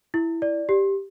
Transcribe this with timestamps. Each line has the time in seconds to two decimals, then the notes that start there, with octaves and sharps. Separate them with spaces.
0.14 E4
0.42 D5
0.69 G4